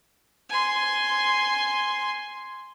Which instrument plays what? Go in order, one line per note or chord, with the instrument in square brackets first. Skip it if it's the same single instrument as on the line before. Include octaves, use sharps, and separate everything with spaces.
[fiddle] G#5 C6